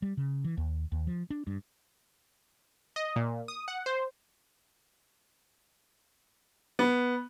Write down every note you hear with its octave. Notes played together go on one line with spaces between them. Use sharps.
G3
C#3
E3
D#2
D#2
F3
D4
G2
D#5
A#2
D#6
F#5
C5
B3